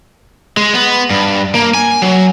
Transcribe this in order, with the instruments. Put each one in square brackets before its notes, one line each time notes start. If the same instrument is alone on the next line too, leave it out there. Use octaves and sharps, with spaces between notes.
[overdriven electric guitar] G#3
B3
G2
A#3
G#5
F#3